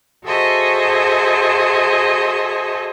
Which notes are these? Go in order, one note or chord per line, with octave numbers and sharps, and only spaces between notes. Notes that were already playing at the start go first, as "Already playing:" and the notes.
F#4 G#4 A4 C5 D#5 E5